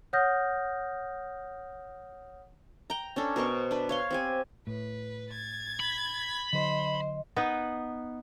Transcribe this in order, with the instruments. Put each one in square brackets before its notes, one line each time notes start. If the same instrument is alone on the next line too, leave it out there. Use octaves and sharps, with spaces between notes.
[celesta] C#5 F#5 D#6 F6 G6 A#6
[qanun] G5 A#5
C#4 D4 A4
B2 A#4 C5 C#6
D4 B4
C#5 F5 C6
C4 G4 G#5
[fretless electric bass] A2 [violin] B4
[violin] G#6 A6
[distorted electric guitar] B5
[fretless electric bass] D3 F#3 [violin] C5 [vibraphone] D#5
[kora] B3 D#4 B4